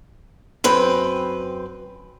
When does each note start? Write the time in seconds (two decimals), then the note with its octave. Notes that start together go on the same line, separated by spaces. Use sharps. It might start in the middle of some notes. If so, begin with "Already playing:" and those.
0.64 F#2 C4 B4 G5